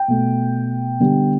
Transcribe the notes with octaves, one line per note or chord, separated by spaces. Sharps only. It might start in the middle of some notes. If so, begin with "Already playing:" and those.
Already playing: G5
B2 A3
D3 G3 B3